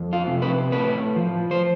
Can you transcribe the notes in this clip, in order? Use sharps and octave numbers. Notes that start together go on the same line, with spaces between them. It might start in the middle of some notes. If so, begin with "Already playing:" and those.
Already playing: F2
F4
C3
B4
A2 B4
F3
C5